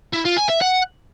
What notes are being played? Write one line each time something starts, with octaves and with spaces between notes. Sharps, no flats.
E4
F4
G#5
E5
F#5